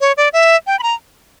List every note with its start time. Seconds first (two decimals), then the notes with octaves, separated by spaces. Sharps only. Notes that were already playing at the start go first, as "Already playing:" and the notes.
0.01 C#5
0.17 D5
0.33 E5
0.67 G5
0.79 B5
0.83 A#5